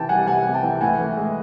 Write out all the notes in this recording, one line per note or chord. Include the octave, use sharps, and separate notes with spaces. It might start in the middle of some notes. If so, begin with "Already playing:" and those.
Already playing: C3 E3 G5 A5
G3 F#5 G#5
C3 F#5 G#5
C3
G5 A5
E3
A2 F#5 G#5
E3
G#3